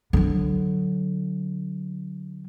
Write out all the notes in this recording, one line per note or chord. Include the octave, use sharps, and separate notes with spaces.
D3 F#3